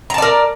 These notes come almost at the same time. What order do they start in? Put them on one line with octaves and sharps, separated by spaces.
A#5 A5 D5 A#4